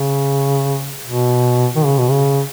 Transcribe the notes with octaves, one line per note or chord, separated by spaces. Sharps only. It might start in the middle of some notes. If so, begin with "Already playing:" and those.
Already playing: C#3
B2
D#3
C#3
B2
C#3